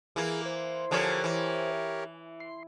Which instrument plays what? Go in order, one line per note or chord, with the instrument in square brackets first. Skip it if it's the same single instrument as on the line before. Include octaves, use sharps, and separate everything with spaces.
[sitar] E3 A#3 [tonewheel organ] G#4
[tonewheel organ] C5
[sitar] D3 F3 C#4 [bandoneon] G4 A#4 C#5
[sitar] E3
[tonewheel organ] C6